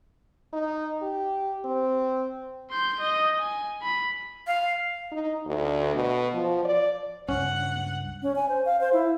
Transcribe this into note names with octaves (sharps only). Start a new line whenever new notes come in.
D#4
G4
C4
C6 G6
D#5
G#5
B5
F5
D#4
D2
B2
F3
D5
C#2 G2 C#4 F#5
C#4
G#5
C5
F5
C5
E4